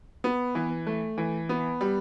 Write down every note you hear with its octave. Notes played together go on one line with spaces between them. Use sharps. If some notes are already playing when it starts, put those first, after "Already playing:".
B3
E3
A3
E3
B3
G3